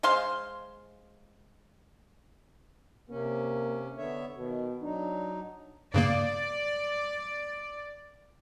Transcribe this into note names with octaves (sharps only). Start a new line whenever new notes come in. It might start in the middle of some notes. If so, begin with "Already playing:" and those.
G#3 C5 F5 C6
C3 A#3 C#4
D3 B3 C#5 E5
B2 D#3
F#3 D4 D#4
G2 C#3 A#3 D5